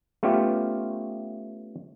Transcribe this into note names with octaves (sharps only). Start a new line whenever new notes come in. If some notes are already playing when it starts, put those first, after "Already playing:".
A3 B3 C#4 F4 G4